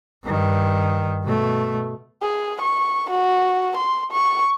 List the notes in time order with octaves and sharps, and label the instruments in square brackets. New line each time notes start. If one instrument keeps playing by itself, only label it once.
[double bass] G2 D#3
B2 A3
[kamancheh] G#4
C#6
F#4
C6
C#6